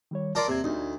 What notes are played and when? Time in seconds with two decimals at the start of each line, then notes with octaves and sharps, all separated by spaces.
0.11 D#3 G3 C#5
0.35 F4 A#4 D5 A5 C6
0.48 E2 C3 A#3 G#6
0.64 D2 D#4